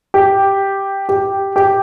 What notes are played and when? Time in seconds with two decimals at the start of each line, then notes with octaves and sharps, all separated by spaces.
0.14 G4
1.09 G4
1.56 G4